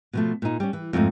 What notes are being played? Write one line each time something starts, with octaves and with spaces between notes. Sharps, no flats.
B2 F3 A3
A#2 D#4
G3 C#4
E3
F2 G#2 A3 C#4 D#4